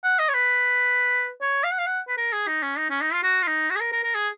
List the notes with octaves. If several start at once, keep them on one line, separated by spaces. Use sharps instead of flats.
F#5
D#5
C#5
B4
C#5
F5
F#5
F5
F#5
B4
A#4
G#4
D#4
C#4
D#4
C#4
D#4
F4
F#4
F4
D#4
F#4
G#4
A#4
A#4
A#4
G#4